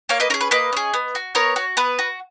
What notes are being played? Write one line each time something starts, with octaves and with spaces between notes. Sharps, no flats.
A#3 C#5 F5
B4 D#5
C#4 G#4 A#4
B4
A#3 B4 D#5
C#4 G#4
B3
F#4
B3 A#4 C#5
F#4
B3 B4
F#4